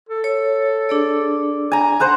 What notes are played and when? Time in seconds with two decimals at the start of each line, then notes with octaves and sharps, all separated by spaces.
0.09 A4
0.24 C#5
0.89 D4 G#4 D5
1.72 G#5 A#5
2.00 C5 F#5 A#5